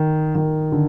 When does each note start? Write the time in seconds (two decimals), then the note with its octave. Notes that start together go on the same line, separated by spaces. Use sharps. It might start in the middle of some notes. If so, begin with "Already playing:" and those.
Already playing: D#3
0.35 D#3
0.72 D3